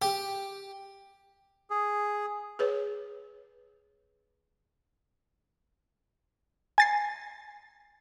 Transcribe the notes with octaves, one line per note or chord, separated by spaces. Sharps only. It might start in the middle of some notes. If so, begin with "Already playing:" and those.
G4
G#4
G#4 B4 C#5
G#5 A6 C7